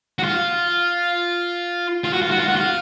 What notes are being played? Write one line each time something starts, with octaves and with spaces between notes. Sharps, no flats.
F#4
F4
F4
F#4
F4
F#4
F4
F#4
F4